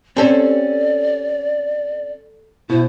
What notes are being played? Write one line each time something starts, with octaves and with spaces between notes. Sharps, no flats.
C4 C#4 G4 A4 D5
B2 E4 C5